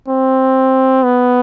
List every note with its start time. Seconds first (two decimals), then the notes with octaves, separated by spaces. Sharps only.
0.08 C4
1.04 B3